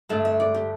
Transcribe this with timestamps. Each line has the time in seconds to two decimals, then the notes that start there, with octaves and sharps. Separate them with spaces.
0.09 G2 D3 A3 D4 E5
0.25 E5
0.40 D5
0.54 G4